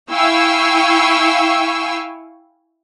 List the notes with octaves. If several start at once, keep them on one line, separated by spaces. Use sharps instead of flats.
E4 F5 G5 G#5 C#6 E6